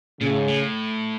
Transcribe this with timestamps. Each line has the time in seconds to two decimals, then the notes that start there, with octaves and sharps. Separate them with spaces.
0.22 A#2 C#3
0.31 A2
0.39 G#2
0.48 A2